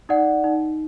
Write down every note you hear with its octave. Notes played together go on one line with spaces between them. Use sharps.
D#4 D5 F#5
D#4